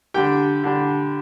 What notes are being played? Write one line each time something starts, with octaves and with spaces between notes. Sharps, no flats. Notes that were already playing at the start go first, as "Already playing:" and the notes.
D3 G3 D4 G4 G5
D3 G3 D4